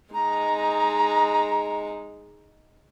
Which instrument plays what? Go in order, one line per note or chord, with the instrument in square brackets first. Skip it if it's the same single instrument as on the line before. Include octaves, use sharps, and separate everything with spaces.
[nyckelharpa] G#3 D#4 [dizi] A#5